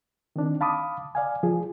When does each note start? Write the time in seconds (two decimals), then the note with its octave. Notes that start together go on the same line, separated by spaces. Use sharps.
0.36 D#3 C4 D4 D#4
0.61 F5 A5 B5 D6 D#6
1.15 D5 F5 G#5
1.43 F3 F4 G#4